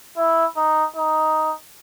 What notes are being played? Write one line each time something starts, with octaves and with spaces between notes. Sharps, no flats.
E4
D#4
D#4